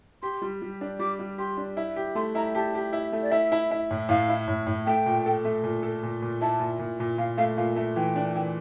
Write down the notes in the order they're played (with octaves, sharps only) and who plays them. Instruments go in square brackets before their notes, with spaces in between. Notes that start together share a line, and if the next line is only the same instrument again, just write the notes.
[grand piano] G4 [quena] C6
[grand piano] G3
G3
D4
[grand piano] G3 [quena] D6
[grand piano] G3
[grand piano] G4 [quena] C6
[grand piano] D4
E4
G4
[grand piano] A3 [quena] C6
[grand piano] E4 [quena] A#5
[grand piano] G4 [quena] A5
[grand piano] G4
E4
A3
[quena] D5
[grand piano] E4 [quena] E5
[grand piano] E4
E4
A2
[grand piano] A2 [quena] F5
[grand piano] E4
A2
A2
[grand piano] A3 [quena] G5
[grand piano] A#2
A4
A3
A#2
A4
A#2
A#2
[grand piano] E4 [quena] A5
[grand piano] A#2
A#2
A#2
[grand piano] A#2 [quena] F5
[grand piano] A3 [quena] F5
[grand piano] A#2 [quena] F5
[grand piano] A3
[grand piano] E3 [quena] G5
[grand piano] D4
E3